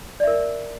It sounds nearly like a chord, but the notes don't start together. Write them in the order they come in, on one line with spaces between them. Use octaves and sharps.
D5 E5 A#4